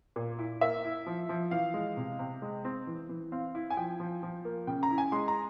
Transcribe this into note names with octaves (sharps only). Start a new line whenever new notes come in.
A#2
E4
A#3 E5
E4
F3
F3
E3 F5
G#3
C3
C3
G#3
C4
E3
E3
C4 F5
E4
G#5
F3 G5
F3
F3
A#3
C#3 G5
A#5
E4
G#5
G#3 C6
A#5